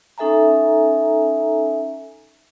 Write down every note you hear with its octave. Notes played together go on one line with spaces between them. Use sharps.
C#4 D#4 A4 E5 G#5 A#5